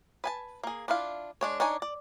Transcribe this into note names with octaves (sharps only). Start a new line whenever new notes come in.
B4 G#5 A5
A#3 G#4
D4 E4 F4 F5
G#3 D4 C#5
D4 D#4 C#5 G#5
D5